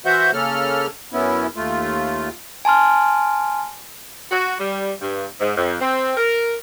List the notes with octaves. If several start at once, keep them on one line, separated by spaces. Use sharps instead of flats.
E3 F#4 C5 E5 F#5 G6
C#3 A#3 C#4 A4 F6
F#2 B3 C#4 E4
D#2 A3 F4
G#5 A5 C6 F6
F#4
G3
G2
G#2
F2
C4
A#4